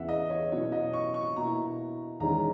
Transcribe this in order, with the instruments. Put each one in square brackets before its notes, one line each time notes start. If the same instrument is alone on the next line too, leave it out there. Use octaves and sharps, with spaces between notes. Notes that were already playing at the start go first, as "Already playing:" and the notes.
Already playing: [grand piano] E2 C#3 E3 B3 E4 E5 F#5
D#5
C#5
B2 F#3 C#4 E4 C#5
D#5
C#6
C#6
B2 A#3 E4 A#5
E2 D#3 G#3 C#4 E4 A#5